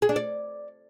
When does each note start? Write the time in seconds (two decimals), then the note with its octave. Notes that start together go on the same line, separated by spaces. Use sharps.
0.02 G#4
0.09 D4
0.16 D5